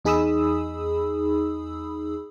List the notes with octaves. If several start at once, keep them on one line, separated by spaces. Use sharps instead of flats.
E2 D#4 G#4 B5 D#6 E6